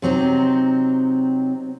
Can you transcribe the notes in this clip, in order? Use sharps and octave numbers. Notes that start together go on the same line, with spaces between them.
C3 F#3 C4 D#4